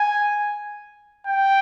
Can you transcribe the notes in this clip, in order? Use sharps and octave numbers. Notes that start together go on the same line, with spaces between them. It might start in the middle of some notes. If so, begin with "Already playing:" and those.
Already playing: G#5
G5